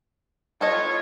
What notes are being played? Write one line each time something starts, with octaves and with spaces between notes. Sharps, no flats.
B3 F4 A4 C#5 D#5